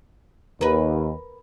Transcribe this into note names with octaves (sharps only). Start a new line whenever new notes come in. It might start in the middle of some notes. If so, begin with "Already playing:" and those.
D#2 A#4 B4